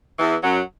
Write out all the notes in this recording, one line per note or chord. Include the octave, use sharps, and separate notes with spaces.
E2 E3
F#2 F#3